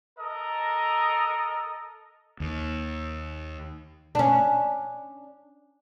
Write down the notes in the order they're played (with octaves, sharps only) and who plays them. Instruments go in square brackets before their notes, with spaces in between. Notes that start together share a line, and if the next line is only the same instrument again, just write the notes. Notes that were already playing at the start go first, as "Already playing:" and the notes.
[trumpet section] A4 A#4 D#5 D#6
[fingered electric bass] D#2
[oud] C#4 D4